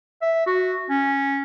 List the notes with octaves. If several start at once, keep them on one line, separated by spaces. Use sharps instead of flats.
E5
F#4
C#4